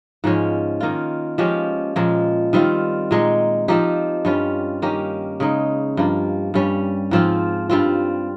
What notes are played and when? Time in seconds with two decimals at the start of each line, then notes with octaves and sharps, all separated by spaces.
0.24 G#2 F3 G#3 C#4
0.81 D#3 A#3 F4
1.38 F3 G#3 C#4 G4
1.96 A#2 F3 G#3
2.53 D#3 G3 C4 F4
3.11 A#2 G#3 D#4
3.68 F3 C4 D#4 G4
4.25 G2 G3 C#4 F4
4.82 D#3 A#3 C#4 G4
5.40 C#3 G#3 D#4
5.97 G2 F3 A#3
6.54 G2 G3 C#4
7.11 G#2 F3 C4 F4
7.70 G2 G3 C4 F4